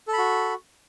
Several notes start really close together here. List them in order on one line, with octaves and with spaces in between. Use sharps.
A4 B5 F#4